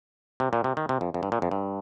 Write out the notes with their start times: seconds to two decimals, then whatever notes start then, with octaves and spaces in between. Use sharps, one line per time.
0.40 C3
0.53 A#2
0.64 C3
0.77 D#3
0.89 C3
1.01 F2
1.14 F2
1.23 G2
1.32 A#2
1.42 F2
1.51 G2